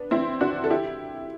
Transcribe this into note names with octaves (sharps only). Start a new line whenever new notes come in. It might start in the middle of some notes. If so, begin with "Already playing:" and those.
Already playing: B3 D4
C4 E4
D4 F#4
A4
E4 G4